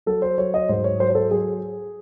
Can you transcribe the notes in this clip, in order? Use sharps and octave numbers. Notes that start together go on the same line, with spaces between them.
F#3 A4
C5
F#3 C#5
D#5
G#2 C5
C#5
F#3 C5
C5
A4
F#3 G#4